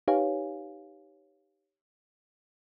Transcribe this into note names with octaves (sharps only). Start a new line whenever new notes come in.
D#4 G4 B4 C#5 F5 G#5